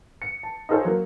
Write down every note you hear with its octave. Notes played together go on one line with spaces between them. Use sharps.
C#7
A5
D#4 F4 G#4 A4 C5 C#5
F#3 A#3